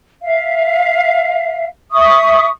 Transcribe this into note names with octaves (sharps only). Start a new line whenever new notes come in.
E5 F5
E5 C#6 D#6